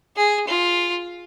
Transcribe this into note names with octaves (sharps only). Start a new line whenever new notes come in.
G#4
F4